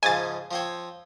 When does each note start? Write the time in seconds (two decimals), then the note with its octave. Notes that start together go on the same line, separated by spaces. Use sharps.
0.03 G#2 C#3 F3 G#5 A6
0.51 F3 C4 C#5